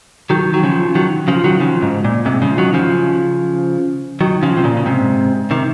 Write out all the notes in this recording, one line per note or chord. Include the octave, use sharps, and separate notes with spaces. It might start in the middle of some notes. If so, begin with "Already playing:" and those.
D#3 F#3
F#3
C#3 F3
D#3 F#3
C#3 F3
D#3 F#3
C#3 F3
G#2
A#2
G#2 C3
C#3 F3
D#3 F#3
C#3 F3
D#3 F#3
C#3 F3
C3
A#2 C#3
C#3
G#2 C3
C3 D#3